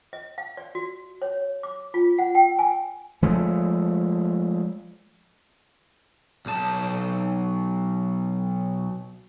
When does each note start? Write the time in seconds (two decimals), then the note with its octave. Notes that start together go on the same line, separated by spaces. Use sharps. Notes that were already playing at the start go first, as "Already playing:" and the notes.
0.13 D#5
0.38 F5
0.57 D5
0.75 F#4
1.22 C#5
1.63 D6
1.94 F4
2.19 F#5
2.35 G5
2.59 G#5
3.22 F3 G#3 A3
6.46 B1 A5